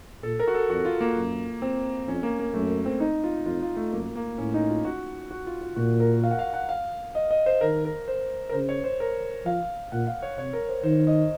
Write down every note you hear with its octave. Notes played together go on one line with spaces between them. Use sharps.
A#2 A4
A#4
F#4
A4
F2 F#4
F4
A#3
F#2
C4
F2 C#4
A#3
A#3
F#2 A3
C4
D#4
F4
F2 F4
F4
A3
F#2 A#3
A#3
A2 C#4
D#4
F4
F#4
F#4
F4
F4
A#2 F#4
A#4
F5
F#5
F5
F#5
F5
D#5
D#5
C5
D#3 A#4
A#4
C5
A#4
C#3 C5
C#5
C5
A#4
F3 F5
A#2 F#5
F5
C#5
C3 C#5
A#4
C5
D#3 C5
D#5